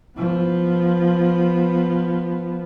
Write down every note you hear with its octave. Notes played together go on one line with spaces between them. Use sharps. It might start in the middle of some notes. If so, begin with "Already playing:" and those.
F3 B3